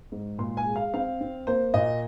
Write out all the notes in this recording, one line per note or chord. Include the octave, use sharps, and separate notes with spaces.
G#2
A#2 C6
G#5
G#3
F5
C4 F5
C4
A#3 C5
A#2 D#5